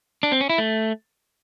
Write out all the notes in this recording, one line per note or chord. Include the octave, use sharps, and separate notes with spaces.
D4
C4
C#4
E4
A3